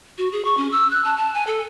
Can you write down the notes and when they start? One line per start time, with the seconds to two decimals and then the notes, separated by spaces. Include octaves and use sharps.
0.18 F#4
0.32 G#4
0.45 C#6
0.57 C#4
0.72 E6
0.91 F#6
1.04 A5
1.17 A5
1.34 G#5
1.47 A4